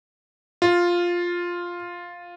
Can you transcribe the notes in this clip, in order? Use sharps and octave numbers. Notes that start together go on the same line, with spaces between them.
F4